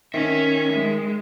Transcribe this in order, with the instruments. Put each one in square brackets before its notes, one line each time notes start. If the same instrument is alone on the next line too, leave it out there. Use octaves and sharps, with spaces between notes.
[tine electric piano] D#3 [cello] C#4 [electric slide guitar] E5
[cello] G#3